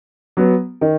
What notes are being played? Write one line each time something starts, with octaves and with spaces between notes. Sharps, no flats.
F#3 B3
D#3